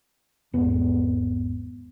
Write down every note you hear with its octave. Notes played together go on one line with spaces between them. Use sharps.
G#1 E2 B3